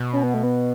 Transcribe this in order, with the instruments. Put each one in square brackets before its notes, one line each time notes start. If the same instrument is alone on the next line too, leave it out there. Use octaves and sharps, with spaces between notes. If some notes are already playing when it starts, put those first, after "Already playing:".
Already playing: [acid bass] B2
[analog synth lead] C#4
B3
A3
B3